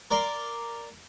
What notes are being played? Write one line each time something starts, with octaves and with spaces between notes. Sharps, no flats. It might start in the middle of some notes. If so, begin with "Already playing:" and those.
A#4 D5 A#5 C6